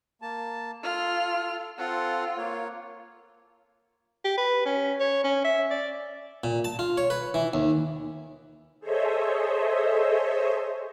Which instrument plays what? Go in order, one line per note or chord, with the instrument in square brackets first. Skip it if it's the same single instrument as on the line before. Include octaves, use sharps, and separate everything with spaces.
[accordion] A#3 A5
[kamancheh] F4 F6 [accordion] A4
[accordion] C4 A4 F#5 [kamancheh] F4
[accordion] A#3 C#5
[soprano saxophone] G4
B4
C#4
C#5
C#4
E5
D5
[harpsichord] A#2
A5
F4
C#5
B4
E3
D#2
[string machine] G#4 A4 C5 C#5 D#5 E5